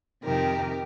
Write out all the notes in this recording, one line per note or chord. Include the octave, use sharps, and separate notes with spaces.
F2 C3 D#3 G4 A#4